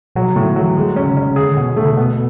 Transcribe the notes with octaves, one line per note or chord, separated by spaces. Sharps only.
B2 F#3
A2 C#3
D3
F#3
E3
D3 G#3
C#4
C#3
C#4
C#3
D3 G#4
D3
B2
D3
A3
C#3
C#3
B2 B3